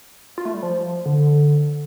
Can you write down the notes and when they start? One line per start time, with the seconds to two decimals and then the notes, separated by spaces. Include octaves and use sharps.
0.38 F4
0.45 A3
0.54 G3
0.63 F3
1.06 D3